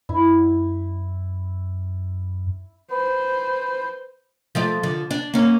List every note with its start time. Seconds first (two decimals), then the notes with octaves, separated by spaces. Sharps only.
0.09 F#2 E4
2.91 B4 C5
4.55 F3 A3 D5
4.83 D3 F3
5.11 D4
5.34 A#3 C#4